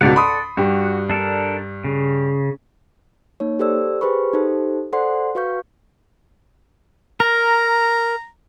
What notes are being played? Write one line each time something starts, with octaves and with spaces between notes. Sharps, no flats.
C#2 G#2 B2 A4 D5 F#5
B5 C6 D#6
G2 F#4 G4
D4 A4 A#4
C#3
A#3 D#4 C#5
G4 A4 C5 D5 E6
G4 G#4 B4 C5 B5 C#6
D#4 G4 A4 C5
A4 C5 D5 F#5 C6
F#4 B4 F5 C#6 G6
A#4 A#5